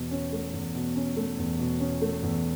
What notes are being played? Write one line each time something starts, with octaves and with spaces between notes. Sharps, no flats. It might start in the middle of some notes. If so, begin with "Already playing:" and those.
Already playing: E2 B2
C#4
A3
E2
B2
C#4
A3
E2
B2
C#4
A3
E2